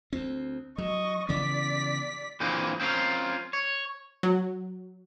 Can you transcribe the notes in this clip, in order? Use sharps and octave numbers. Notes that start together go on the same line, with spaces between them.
D2 C4
F#3 D#5 C#6
C#3 E3 B3 D5 B6
A#2 D3 E3 A#3 C4 G#4
C4 C#4 E4 F4 A#4
C#5
F#3